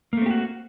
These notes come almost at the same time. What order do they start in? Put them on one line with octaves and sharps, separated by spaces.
A#3 A3 C4 G4 F#4